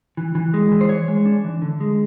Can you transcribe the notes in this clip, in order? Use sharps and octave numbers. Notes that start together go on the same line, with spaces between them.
E3
E3
G#3
E3
C5
E3 C#5
G#3
D4
E3
D3
G#3